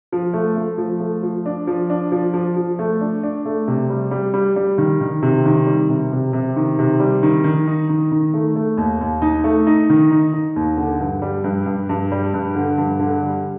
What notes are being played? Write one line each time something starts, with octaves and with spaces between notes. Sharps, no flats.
F3
A3
A3
F3
A3
F3
D4
F3
D4
F3
F3
F3
A3
D4
D4
A3
C3
G3
G3
G3
G3
D#3
D#3
C3
D#3
G3
C3
C3
C3
D#3
C3
G3
D#3
D#3
D#4
D#3
D#3
A3
A3
D#2
D#2
D#4
A3
D#4
D#3
D#4
D#4
D#2
D3
G2
G3
G2
G2
G2
G3
G2
D3
G2
D3
G3